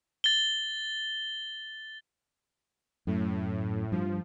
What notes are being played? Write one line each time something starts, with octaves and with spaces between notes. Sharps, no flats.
A6 G7
F#2 A2
G2 F3